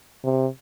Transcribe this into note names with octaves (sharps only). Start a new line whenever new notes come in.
C3